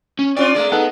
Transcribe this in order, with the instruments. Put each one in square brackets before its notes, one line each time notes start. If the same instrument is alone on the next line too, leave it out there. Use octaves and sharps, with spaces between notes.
[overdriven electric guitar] C#4
[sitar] C4 D4 F4 [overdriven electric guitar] D5
[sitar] G#3 A3
[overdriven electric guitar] B3 [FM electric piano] D#4 A4 F#5